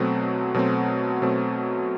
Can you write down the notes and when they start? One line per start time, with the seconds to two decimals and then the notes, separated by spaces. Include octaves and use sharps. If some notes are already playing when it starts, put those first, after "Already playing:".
Already playing: B2 F#3 A3 C4
0.54 B2 F#3 A3 C4
1.22 B2 F#3 A3 C4